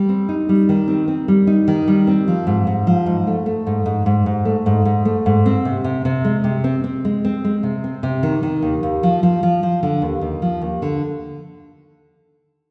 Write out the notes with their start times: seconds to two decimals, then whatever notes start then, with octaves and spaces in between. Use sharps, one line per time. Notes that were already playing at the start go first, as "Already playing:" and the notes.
Already playing: G3
0.09 C4
0.29 D#4
0.49 G3
0.69 D#3
0.88 C4
1.08 C4
1.28 G3
1.47 D#4
1.68 D#3
1.88 G3
2.07 C4
2.28 F3
2.47 G#2
2.67 G#2
2.87 F3
3.06 G#2
3.27 A3
3.46 A3
3.67 G#2
3.86 G#2
4.06 G#2
4.26 G#2
4.45 A3
4.66 G#2
4.85 G#2
5.05 A3
5.26 G#2
5.46 C4
5.65 C3
5.84 C3
6.05 C3
6.25 G#3
6.44 C3
6.64 C4
6.84 C4
7.05 G#3
7.25 C4
7.44 G#3
7.63 C3
7.84 C4
8.03 C3
8.23 D#3
8.43 D#3
8.62 D#2
8.83 D#2
9.03 F3
9.23 F3
9.43 F3
9.63 F3
9.83 D3
10.02 D#2
10.21 D#2
10.42 F3
10.62 D#2
10.82 D3